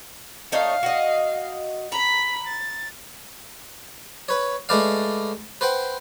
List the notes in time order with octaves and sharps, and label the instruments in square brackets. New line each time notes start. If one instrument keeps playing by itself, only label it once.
[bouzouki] A3 D#4 C#5 [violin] F5
[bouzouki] F#4 D#5
[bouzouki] A#5 [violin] B5 B6
[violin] A6
[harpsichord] B4 C#5
G#3 A3 B4 D5 F5
B4 C5 F#5 G5